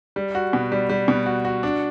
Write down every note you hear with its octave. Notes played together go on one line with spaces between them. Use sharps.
G3
F#4
B2
G3
G3
B2
F#4
F#4
D4